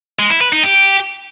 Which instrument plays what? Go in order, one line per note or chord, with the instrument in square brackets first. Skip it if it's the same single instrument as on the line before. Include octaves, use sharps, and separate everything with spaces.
[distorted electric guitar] G#3
E4
B4
D#4
G4